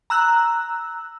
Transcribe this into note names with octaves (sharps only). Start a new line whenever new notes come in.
A#5 E6 F#6